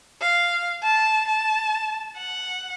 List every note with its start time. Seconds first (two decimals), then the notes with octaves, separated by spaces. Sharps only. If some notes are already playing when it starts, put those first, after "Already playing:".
0.22 F5
0.84 A5
1.28 A5
2.17 F#5